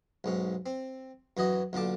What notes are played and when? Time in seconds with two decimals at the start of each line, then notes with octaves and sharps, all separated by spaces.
0.24 B1 G#2 C#4
0.66 C4
1.37 F#2 E3 F#4 D#5
1.73 B1 A#2 D3 A5 D6